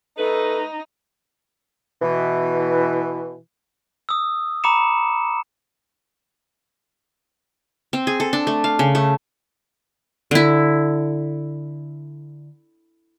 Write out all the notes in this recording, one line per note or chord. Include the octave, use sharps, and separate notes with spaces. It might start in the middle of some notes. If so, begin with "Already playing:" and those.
A3 D#4 A4 B4
B2 E3
D#6 E6
A#5 B5 D6 C#7 E7
C4
G#4
A4
D4
A3
F5
C#3
A3
D3 E4